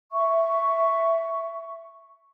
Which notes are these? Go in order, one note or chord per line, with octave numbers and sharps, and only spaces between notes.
E5 C#6